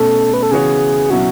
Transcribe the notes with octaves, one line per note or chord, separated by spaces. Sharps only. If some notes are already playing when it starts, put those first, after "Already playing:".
Already playing: B2 A3 C#4 A4
B4
A4
C#3 E3 B3 F#4 G#4 C#5
B2 F#3 C#4 E4 F#4